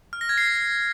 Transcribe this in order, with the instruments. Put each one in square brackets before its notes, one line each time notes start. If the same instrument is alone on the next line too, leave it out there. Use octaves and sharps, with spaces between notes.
[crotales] F6
A#6
G#6
C7